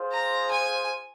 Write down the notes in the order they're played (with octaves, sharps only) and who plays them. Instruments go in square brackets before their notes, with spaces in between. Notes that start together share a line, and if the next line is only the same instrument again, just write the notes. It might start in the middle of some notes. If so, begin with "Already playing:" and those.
Already playing: [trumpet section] F4 G#4 C5
[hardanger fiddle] A#5
G#5